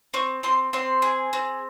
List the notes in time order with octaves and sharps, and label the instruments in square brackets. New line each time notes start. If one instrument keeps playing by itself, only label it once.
[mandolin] C4 C#6
C4 C6
C4 C6
G#4
C4